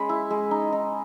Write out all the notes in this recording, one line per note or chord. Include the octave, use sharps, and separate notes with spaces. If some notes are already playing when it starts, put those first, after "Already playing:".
Already playing: G#3 C#4 B5
E4
G#3
D#4
D#4